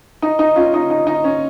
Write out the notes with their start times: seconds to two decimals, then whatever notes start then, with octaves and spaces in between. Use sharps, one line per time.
0.22 D#4
0.39 D#4
0.56 C#4 F4
0.74 D#4
0.90 D#4
1.07 D#4
1.24 C#4